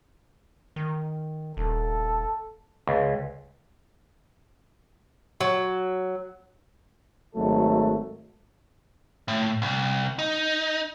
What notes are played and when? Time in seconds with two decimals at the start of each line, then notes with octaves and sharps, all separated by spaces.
0.76 D#3
1.57 D#1 A4
2.87 C#2
5.40 F#3
7.35 G#1 F#3 A3 A4
9.28 A2
9.62 C2
10.19 D#4